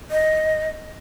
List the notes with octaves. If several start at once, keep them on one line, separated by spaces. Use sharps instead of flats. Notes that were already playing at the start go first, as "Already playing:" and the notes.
D#5